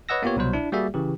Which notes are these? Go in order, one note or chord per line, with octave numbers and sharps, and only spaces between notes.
B4 C#5 D#5 F#5 E6 A#6
A#3 B3 F4 G4 C#5
C2 B2 F#3 C5
D4 E4
G3 A#3 F#4 G#4 D5 E5
C#3 E3 G4